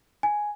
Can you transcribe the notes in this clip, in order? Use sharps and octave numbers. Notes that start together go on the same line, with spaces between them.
G#5